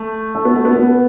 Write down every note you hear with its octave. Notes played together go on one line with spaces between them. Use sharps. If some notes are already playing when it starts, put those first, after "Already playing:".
Already playing: A3
A3
B3
A3
B3
B3